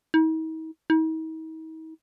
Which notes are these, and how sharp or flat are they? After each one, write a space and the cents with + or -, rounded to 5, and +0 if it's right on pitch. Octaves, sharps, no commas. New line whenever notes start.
D#4 +45
D#4 +45